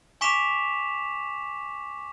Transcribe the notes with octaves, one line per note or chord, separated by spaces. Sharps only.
G#5 C#6 D6 B6 E7 F7